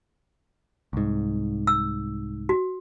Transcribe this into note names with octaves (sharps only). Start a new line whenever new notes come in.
C2 G#2
E6
F#4